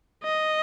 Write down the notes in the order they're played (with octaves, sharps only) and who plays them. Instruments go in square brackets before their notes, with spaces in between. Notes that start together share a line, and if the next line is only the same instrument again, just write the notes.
[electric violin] D#5